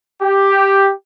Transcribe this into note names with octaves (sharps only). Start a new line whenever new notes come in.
G4